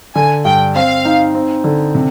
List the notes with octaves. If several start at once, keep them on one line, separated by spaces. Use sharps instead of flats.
D3 G#5
G2 G5
C4 F5
D#4
C4
D3
C3